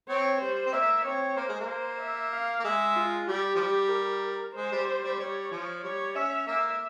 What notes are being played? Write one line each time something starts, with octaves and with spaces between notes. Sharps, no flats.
C4 C#5
G3 C5
C4
A#3 E5
C4 C#5
A#3 C5
G#3
A#3
C5
E5
F5
A#3
G#3 E5
F4
G3 G4
F3
G3
A#4
G#3 C5
G3
G3
G3
G3 C#5
F3
G3 C#5
C#4 E5
A#3 E5